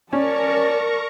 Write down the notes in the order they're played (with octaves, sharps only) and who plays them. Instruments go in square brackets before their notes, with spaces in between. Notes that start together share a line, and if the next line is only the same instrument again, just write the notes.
[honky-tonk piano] C#4 [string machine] A#4 A#5 C#6 [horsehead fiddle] D5 A5